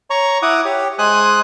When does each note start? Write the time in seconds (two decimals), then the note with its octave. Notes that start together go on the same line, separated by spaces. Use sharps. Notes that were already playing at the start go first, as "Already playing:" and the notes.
0.10 C#5 A#5 C#6
0.42 E4 F#5 D6 D#6
0.65 G4 C#5
0.98 G#3 C5 G#5 D#6 F#6